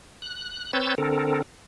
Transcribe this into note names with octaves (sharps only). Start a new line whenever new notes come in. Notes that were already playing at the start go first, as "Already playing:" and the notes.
F#6
C4 B4 C#5 E6 G6 A6
D3 C4 A4 A#4